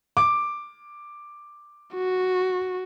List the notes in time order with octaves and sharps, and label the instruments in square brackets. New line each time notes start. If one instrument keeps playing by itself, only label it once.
[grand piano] D6
[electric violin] F#4